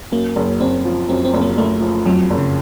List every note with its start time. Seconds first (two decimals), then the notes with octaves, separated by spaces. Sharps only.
0.12 F#2 A#3
0.36 F#1
0.60 F#1 C4
0.85 F3
1.09 F#2 C4
1.25 C4
1.33 F#1
1.41 A#3
1.58 F#1 A3
1.81 F3
2.05 F2 F#3
2.30 F#1
2.38 C#3